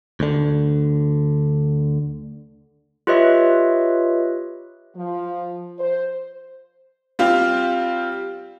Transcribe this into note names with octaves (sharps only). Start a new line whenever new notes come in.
D2 D3
F4 G4 B4 C#5 D#5 E5
F3
C5
G3 C4 F4 G4